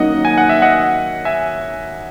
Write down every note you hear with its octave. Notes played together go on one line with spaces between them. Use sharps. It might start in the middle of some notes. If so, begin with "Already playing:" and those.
Already playing: D#3 F#3 A#3 C#4 F#4 D#5 F#5
G#5
F#5
E5
D#5 F#5
E5 G#5